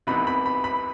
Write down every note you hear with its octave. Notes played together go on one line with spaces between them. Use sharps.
C2 C3 E3 B3 D#4 B5
B5
B5
B5